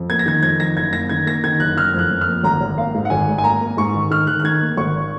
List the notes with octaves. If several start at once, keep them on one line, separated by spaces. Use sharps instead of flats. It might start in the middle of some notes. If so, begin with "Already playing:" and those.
Already playing: F2
A#3 G#6
A#6
D#3 G#6
F2 G#6
D#3 A#6
F#1 G#6
A#3 A#6
D#3 G#6
A#3 A#6
D#3 G#6
F#1 F#6
F#1 F6
F2 F#6
F2
F6
A#3
G#1 A#5
G#1
A#3 F5
G#2
F#5
G#1 G#5
G#2
G#5
A#3 A#5
A#3
G#2 C#6
D#3
D#3 F6
D#3 F#6
F#6
D#3 G#6
A#3
G#1 C#6